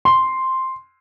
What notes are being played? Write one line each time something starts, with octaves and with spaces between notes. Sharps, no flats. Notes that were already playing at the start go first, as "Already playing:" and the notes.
C6